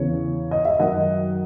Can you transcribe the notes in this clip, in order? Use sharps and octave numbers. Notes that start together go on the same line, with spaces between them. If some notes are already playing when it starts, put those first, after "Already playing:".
Already playing: E2 C#3 E3 C#5
D#5
E5
F#2 D#3 F#3 D#5 F#5